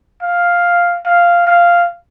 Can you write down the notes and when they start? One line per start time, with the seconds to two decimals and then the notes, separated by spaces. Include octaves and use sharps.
0.23 F5
1.06 F5
1.47 F5